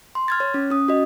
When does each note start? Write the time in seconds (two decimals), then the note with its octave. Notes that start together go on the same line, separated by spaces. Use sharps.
0.15 C6
0.28 F6 G#6 A6
0.40 C#5
0.54 C#4
0.70 C#4 D#6
0.88 F#4 D#5